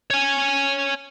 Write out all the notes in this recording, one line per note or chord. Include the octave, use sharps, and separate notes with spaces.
C#5 G#5